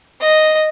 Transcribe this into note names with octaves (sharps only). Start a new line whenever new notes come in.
D#5